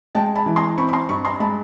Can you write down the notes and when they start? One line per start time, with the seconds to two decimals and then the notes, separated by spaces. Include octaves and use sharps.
0.15 G#3 G5 A5
0.35 A5 B5
0.46 E3
0.56 A#5 C6
0.77 C4 B5 C#6
0.89 B5
0.93 A#5 C6
1.09 G2 B5 C#6
1.25 A#5 C6
1.40 G#3 A5 B5